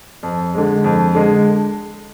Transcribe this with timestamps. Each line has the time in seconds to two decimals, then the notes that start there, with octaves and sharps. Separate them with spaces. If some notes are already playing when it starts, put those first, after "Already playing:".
0.23 F2
0.54 D3 G#3
0.84 F2
1.15 D3 G#3